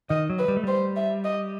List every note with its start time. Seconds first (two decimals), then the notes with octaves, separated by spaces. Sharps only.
0.10 D#3 D#5
0.30 F#3
0.39 B4
0.48 G3
0.57 A3
0.63 G3 C5
0.96 E5
1.24 D#5